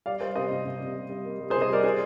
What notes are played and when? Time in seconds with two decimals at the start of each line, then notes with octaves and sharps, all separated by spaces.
0.06 G3 D5 F5
0.21 G3 C5 D#5
0.36 C3 C5 D#5
0.51 C3
0.66 C3
0.81 C3
0.95 G3
1.10 G3
1.24 A#3
1.40 G3
1.50 G#4 C5
1.55 C3
1.61 C5 D#5
1.69 G3 A#4 D5
1.84 G#4 C5